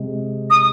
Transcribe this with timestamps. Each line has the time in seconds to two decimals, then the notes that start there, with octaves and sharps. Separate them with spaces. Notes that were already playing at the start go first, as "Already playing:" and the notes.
Already playing: C3 G#3
0.50 D#6